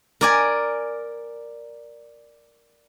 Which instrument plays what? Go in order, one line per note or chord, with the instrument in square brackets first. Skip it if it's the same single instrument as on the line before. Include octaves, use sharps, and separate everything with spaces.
[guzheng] A#4 D5 G#5